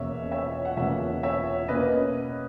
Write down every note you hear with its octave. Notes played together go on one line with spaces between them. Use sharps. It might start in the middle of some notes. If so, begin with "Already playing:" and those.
Already playing: E2 B2 A#3 C#4 C#5 E5
C#5 E5
F#5
E2 B2 A#3 C#4 C#5 E5
C#5 E5
B2 A#3 C#4 B4 D#5